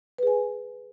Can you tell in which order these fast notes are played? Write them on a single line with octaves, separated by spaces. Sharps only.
B4 G#4 G#5